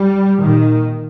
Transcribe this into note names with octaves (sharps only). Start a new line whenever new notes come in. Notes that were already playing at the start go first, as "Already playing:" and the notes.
Already playing: G3
A#2 D#3